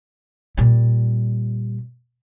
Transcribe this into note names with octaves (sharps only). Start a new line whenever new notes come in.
A#2 G3